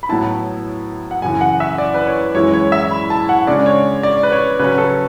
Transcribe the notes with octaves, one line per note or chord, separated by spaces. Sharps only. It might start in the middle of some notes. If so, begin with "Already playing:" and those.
B5
A2 F#3 B3 E4 A5
F#5
F#2 C#3 E3 G#5
F#5
E5
D5
B4
C#5
F#2 E3 G#3 C#4 E4 C#5
C#5
E5
B5
A5
F#5
C#3 G#3 D4 D5
C#5
D5
B4
C#5
C#3 F#3 C#4 B4
A4